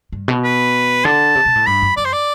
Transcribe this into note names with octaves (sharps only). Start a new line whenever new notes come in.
G2
B2
B4
D3 A5
C3
B2
A2
G2 B5
F#2
F#2 D5
C5
D5